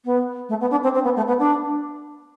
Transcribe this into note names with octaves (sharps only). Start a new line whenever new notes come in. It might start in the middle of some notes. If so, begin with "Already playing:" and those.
B3
A3
B3
D4
C4
C4
B3
A3
B3
D4